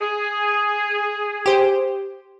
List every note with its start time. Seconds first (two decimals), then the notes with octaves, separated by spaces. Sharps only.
0.01 G#4
1.46 G4 C5